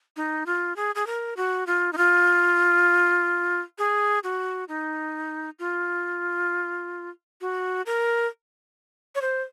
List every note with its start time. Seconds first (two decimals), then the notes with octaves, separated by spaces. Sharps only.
0.16 D#4
0.46 F4
0.76 G#4
0.95 G#4
1.07 A#4
1.37 F#4
1.67 F4
1.93 D#4
1.98 F4
3.78 G#4
4.24 F#4
4.68 D#4
5.59 F4
7.41 F#4
7.86 A#4
9.15 C#5
9.22 C5